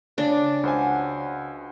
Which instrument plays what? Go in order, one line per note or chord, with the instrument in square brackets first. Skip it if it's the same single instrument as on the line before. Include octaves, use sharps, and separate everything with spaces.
[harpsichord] C#3 [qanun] D4
[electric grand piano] C#2 C5 G#5 [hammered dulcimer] F#4